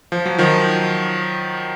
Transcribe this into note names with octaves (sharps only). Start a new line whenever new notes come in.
F3
F#3
D#3 F3